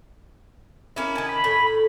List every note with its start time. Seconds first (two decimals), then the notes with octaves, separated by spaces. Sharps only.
0.96 A#3 C#4 E4
1.15 D#3 G#5 A5
1.29 B5
1.44 A2